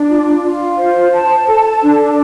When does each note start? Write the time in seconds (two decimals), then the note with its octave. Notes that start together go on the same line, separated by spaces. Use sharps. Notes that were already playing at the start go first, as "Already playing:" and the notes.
Already playing: D4
0.09 F4
0.43 F4
0.78 C5
1.13 A5
1.47 A4
1.82 D4